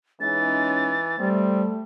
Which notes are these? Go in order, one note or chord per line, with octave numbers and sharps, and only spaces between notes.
E3 G#3 C#4 D#4 A6
G3 A3 C4